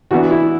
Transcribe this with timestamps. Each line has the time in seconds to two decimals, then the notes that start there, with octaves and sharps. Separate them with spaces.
0.11 E3 B3 D4 F#4
0.31 E4